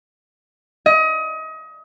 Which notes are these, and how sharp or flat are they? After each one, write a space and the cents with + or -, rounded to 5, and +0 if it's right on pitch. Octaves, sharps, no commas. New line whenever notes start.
D#5 +30